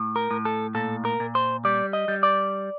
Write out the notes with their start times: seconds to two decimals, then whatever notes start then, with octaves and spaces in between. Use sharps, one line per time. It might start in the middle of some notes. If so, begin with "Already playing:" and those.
Already playing: A2
0.16 A#4
0.31 A2
0.45 A4
0.75 A#2 A4
1.05 A#4
1.20 A#2
1.35 C5
1.65 G3 D5
1.93 D#5
2.08 G3
2.23 D5